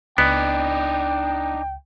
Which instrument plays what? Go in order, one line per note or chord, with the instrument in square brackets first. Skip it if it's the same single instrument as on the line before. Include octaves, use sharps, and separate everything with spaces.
[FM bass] C#2 [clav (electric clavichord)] B3 [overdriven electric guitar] D4 D#4 [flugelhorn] G5